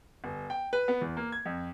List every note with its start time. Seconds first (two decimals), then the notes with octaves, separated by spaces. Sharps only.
0.24 G1
0.50 G5
0.73 B4
0.88 B3
1.01 E2
1.17 A#3
1.32 G#6
1.46 F2